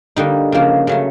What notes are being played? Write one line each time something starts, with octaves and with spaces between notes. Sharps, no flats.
D3 G3 A#3 D#4
C#3 F3 A#3
C#3 F#3 A3